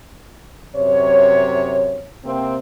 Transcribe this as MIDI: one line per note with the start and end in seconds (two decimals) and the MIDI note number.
0.76 2.06 42
0.76 2.06 48
0.76 2.06 73
2.25 2.56 48
2.25 2.56 58
2.25 2.56 60